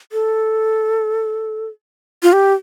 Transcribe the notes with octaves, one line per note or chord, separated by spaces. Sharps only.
A4
F4
G4